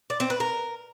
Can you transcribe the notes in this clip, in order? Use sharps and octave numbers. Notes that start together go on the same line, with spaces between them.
D5
C4
B4
A#4